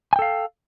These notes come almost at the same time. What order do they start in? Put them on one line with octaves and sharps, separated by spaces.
G#5 G5 A4 F5